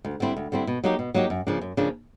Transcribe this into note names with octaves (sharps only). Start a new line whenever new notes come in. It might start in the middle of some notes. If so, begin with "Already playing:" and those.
D2
D3 G3 C4 E4
D2
D3 G3 C4 E4
B2
F#3 A#3 D#4 G4
B2
F#3 A#3 D#4 G4
F#2
C#3 F3 A#3 D4
F#2
C#3 F3 A#3 D4